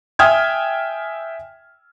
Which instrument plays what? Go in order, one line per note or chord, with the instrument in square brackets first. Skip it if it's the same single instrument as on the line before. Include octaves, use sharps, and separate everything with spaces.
[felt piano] E5 G5 G#5 D#6 F6 G#6